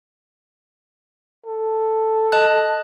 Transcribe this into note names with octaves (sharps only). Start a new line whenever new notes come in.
A4
D#5 A5 F#6